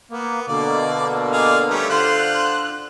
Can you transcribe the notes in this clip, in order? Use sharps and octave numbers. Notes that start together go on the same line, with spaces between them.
A#3 B3
B2 D3 A#3 D5
G#4 D5 F5
G3 A3 C#4
D3 F4 C5 F#6